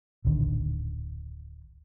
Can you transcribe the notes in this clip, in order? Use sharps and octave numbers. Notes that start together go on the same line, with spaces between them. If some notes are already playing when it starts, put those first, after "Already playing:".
D1 A#1 D3 D#3